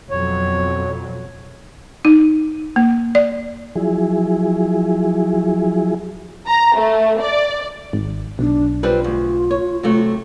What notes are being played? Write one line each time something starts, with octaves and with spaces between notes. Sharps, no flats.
F2 B2 F#3 C#5
D#4
A#3
D5
F3 F#3 E4 G#4
A#5
A3
D5
G#1
B1 D4
G3 C4 F4 B4
D2
C#5
C3 F#3 A3